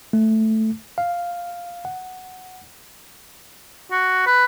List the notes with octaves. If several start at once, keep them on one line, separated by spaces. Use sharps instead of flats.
A3
F5
F#5
F#4
B4